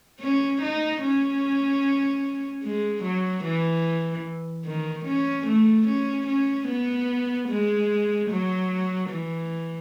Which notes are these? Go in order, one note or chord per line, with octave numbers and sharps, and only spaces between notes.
C#4
D#4
C#4
G#3
F#3
E3
D#3
C#4
A3
C#4
C#4
B3
G#3
F#3
E3